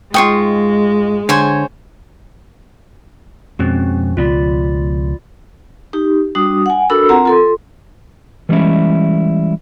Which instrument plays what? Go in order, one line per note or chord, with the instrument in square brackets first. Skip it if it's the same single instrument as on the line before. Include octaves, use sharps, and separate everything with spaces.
[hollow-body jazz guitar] G#2 G5 [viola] G#3 [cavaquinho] F4 C#6 D#6
[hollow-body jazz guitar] D3 [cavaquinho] C5 C#5 G#5
[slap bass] F2 B2 G#3 [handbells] C4 C#4 F#4
[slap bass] C#2 B2 F3 [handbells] F4 D5 B5
[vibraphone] D#4 G4
G3 D4 F#4 D#6
F#5 G#5
D4 F#4 A4 A#4 B5 E6
C4 F4 A#4 F#5 A#5
F4 A4 C6
[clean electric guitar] E3 G3 G#3 C#4 E4